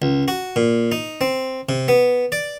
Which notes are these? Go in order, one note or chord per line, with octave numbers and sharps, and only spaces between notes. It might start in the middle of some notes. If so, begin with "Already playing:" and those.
C#2
F#4
A#2
D#4
C4
C3
B3
D5